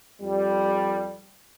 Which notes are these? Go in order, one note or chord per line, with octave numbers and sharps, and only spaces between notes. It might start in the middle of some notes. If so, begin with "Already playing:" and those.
F2 G3